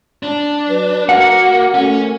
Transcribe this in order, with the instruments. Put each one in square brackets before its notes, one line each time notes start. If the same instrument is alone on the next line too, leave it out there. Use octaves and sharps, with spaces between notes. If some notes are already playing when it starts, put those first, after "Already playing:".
[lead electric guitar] D4
[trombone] F#3 [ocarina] B4
[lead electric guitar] A#3 [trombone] F#4 [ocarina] A#4 [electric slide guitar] F#5
[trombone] A3 [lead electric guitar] C#4